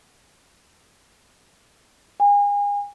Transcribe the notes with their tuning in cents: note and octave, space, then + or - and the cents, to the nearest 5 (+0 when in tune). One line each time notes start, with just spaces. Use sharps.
G#5 -35